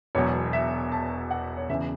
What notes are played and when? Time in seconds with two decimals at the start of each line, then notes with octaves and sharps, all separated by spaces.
0.15 E1 E2 B2 F#3 C#5
0.53 E5
0.92 A5
1.31 F#5
1.57 C#5
1.70 E1 E2 C#3 E5